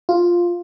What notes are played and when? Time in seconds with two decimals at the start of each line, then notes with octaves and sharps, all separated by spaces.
0.09 F4